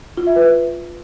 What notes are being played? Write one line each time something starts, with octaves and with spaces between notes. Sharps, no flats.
F4
E5
B4